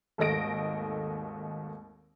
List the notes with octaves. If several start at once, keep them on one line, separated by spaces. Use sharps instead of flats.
G#1 D#2 A3 D#5 A#6 D7